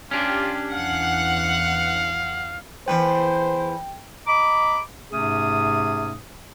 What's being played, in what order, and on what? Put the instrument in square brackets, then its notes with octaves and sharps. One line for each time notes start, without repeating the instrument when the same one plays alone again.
[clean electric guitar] C#4 D4 [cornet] F4 [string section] G4
[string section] E2 F#5 [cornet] F5
[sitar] E2 A#2 B4 [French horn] C5 [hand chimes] G5
[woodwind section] D#5 A#5 B5 D6
G#2 C3 A3 C#4 G#4 D#6